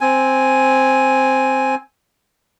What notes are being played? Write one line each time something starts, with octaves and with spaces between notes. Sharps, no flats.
C4 G#5